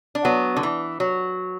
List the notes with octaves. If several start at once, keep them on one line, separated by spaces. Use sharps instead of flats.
D4
F#3 B3
D3
E3
F#3